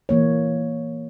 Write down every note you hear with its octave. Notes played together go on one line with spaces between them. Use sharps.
E3 A#3 C#5